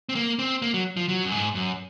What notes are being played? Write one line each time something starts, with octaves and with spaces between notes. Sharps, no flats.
C4
A#3
C4
A#3
F#3
F3
F#3
F#2
G#2
F#2